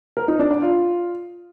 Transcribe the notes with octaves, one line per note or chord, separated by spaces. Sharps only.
A#4
D#4
D4
D5
F4